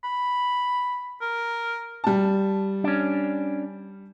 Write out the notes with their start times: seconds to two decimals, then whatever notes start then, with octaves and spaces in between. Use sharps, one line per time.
0.04 B5
1.21 A#4
2.04 G3 A5
2.84 C#4 D4